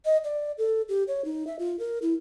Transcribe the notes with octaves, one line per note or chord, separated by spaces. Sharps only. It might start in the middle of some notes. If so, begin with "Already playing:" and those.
D#5
D5
A4
G4
C#5
D#4
E5
F4
A#4
E4